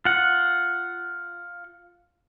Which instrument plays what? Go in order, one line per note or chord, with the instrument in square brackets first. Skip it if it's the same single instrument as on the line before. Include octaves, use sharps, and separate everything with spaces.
[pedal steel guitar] F4 F#5